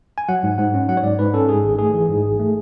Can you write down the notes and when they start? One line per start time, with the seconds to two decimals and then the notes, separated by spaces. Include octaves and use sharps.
0.18 G#5
0.29 F#3 F#5
0.43 G#2
0.58 G#2 F#5
0.74 C#4
0.89 F#3 F#5
0.97 C#5
1.03 G#2 D5
1.19 G#2 B4
1.34 C#4 A4
1.48 G#2 G#4
1.64 G#1
1.79 A3 G#4
1.94 E3
2.09 G#2
2.24 G#1
2.39 A3